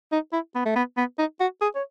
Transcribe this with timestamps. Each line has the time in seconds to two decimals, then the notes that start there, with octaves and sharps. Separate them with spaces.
0.12 D#4
0.33 E4
0.55 B3
0.66 A3
0.76 B3
0.98 B3
1.18 D#4
1.40 F#4
1.61 G#4
1.75 C#5